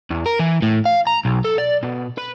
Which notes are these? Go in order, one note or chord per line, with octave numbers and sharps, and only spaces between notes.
E2
A#4
E3
A2
F5
A#5
B1
A4
D5
B2
B4